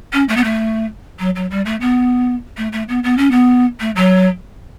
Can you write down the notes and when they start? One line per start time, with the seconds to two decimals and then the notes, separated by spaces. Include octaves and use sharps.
0.13 C#4
0.28 A3
0.36 B3
0.44 A3
1.19 F#3
1.36 F#3
1.50 G3
1.65 A3
1.81 B3
2.57 A3
2.72 A3
2.88 B3
3.03 B3
3.17 C#4
3.31 B3
3.80 A3
3.96 F#3